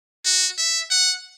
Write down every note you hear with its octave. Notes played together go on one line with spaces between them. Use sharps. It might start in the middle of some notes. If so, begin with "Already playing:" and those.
F#4
E5
F#5